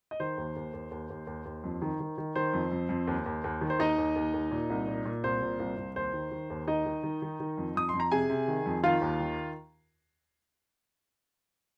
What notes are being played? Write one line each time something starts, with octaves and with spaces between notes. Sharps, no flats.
D#5
D#3 C5
D#2
D#2
D#2
D#2
D#2
D#2
D#2
F2
D#3
D#3
D#3
D#3 C5
F2
F2
F2
D#2
D#2
D#2
D#3
C5
D#2 D#4 D#5
D#2
D#2
D#2
A#2
C2
A#2
A#2
C2 C5
A#2
C2
C2
D#2 C5
D#3
D#3
D#2
D#3 D#4 D#5
D#3
D#3
D#3
D#3
F2
F2 D#6
F2 C6
A#5
C3 G#4 G#5
C3
D#3
F2
D#3 F4 F5
D#2
D#3